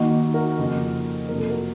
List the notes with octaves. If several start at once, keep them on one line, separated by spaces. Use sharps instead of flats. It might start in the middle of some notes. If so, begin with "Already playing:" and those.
Already playing: D#2 D#3 A#3 D#4 F#4
F#4 A#4
F2 C#3 F3 A#3
F2 C3 F#3 A#3 A#4
A4
F#4 A#4